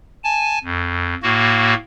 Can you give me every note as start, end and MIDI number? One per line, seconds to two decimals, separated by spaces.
0.24 0.58 80
0.24 0.58 81
0.64 1.14 41
1.23 1.74 45
1.23 1.74 58
1.23 1.74 66